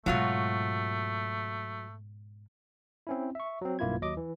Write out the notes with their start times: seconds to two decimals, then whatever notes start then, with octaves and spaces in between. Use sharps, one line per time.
0.06 G#2 B2 F#3 A3 F4 F#4
3.07 C4 C#4 E4
3.35 E5 C#6
3.61 F#3 C4
3.79 B1 G2 A#3 E4 F4 G#6
4.01 D#2 F#3 D#5 D6
4.17 E3